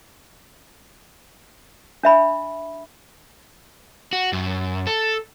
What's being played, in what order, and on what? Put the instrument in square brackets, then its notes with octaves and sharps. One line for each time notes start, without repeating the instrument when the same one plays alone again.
[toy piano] D4 E5 B5
[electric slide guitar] F#4
F#2
A4